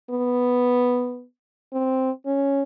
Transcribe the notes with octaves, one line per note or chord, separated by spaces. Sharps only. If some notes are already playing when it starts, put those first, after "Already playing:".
B3
C4
C#4